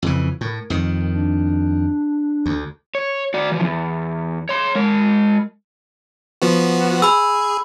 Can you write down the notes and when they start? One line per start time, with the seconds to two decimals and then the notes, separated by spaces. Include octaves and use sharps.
0.03 F2 C#3 E3
0.41 A2 A#4
0.70 F2 D#3
1.14 D4
2.46 D2
2.95 C#5
3.34 F#4 D5
3.52 E3 F3
3.63 E2
4.49 C#5 C6
4.75 G#3 A#4
6.42 F3 B3 F#4
7.02 G#4 B5 E6